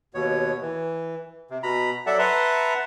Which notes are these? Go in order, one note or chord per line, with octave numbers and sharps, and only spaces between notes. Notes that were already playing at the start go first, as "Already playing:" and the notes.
D#2 B2 C#5
E3
C3
B2 A#5 B5
F#3 A4 D5 E5 F#5 A5
B4 E5 F#5 A5 A#5 C6